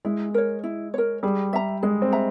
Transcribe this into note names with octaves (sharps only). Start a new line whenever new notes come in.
G#3 E4
A#4 C#5
E4
A#4 C#5
G3 G#4
E5 A#5
G#3 G#4
C4
E5 A#5